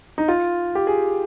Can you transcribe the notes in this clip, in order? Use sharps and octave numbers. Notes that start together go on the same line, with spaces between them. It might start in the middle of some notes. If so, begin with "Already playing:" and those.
D#4
F4
G4
G#4